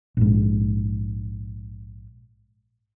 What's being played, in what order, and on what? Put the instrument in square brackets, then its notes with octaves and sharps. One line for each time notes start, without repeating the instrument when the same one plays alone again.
[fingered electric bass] A#1 G#2